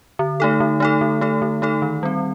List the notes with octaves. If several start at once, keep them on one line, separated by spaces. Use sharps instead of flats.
D3
A3 D#4 A4
D3
A3 D#4 A4
D3
A3 D#4 A4
D3
A3 D#4 A4
D#3
G3 C4